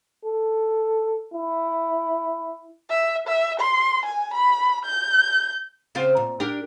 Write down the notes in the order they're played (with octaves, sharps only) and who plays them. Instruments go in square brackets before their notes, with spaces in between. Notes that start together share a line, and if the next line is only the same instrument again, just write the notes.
[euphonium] A4
E4
[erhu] E5
E5
C6
G#5
B5
G6
[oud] C#3 C4 F4
A#2
D4 G4 A#4